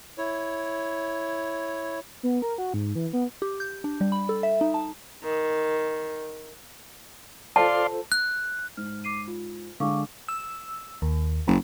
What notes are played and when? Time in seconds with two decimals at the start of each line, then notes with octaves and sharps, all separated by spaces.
0.18 E4 C#5
2.23 B3
2.42 A#4
2.58 F#4
2.74 G#2
2.96 E3
3.13 B3
3.42 G4
3.60 G6
3.84 D4
4.01 G3
4.12 B5
4.29 A4
4.43 E5
4.61 D#4
4.74 A5
5.24 D#3
7.56 F4 A4 C5 D5 F5 A5 C6
8.12 F#6
8.77 G#2 F6
9.04 D6 C7 D#7
9.28 F4
9.80 D3 G#3 F5 C#6 D6
10.29 E6
11.02 D#2
11.47 F#1